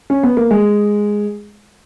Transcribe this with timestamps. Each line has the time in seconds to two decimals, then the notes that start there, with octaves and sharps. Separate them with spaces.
0.10 C#4
0.23 B3
0.37 A#3
0.51 G#3